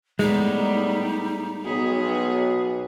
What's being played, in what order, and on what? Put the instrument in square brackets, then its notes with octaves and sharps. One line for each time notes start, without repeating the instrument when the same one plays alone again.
[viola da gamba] A2 G3 B3 [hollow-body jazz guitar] G#3 [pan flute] D#4
[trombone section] B1 [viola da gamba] B3 G#4